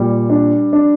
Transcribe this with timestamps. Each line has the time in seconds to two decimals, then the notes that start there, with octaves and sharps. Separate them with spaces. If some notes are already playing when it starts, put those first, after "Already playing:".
Already playing: A#2 G3
0.30 D4
0.73 D4